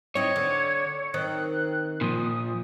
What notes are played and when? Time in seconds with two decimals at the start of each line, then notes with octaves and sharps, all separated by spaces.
0.15 C4 D#4 E4 C#5 G#6
0.36 D3
1.14 D#3 C4 F#6
2.01 A#2 F3 D#6